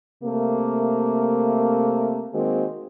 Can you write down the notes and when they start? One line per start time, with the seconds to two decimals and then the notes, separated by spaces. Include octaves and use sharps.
0.24 C3 A3 A#3
2.33 D#3 G#3 A#3 C4 F#4